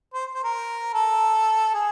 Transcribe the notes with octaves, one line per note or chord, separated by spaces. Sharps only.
C5
C5
A#4
A4
G#4